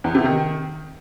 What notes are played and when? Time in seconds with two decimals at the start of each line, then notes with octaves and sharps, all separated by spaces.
0.04 E2
0.15 C3
0.25 D#3